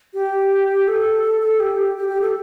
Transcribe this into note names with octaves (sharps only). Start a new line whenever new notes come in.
G4
A4
A4
A4
G4
G4
G4
A4